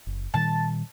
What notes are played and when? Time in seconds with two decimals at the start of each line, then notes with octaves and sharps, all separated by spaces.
0.07 F#1
0.34 A#2 D#3 G3 A5